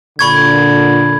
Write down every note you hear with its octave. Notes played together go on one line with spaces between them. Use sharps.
A#2 D3 B5 C#6 G#6